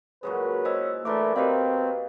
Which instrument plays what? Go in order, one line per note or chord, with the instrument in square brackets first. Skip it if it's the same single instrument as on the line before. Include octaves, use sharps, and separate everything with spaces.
[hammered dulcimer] A#2 F#3 G#3 [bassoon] C#3 [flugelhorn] B4
[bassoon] C#4 [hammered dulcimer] E4 [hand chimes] C5 D#5 E6
[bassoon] E3 [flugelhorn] A3 [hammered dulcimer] D4 A#4 C6 [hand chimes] D5 B5 D6
[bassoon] B2 [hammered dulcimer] A#3 B4 [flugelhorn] C4 [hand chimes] G4 D#5 F5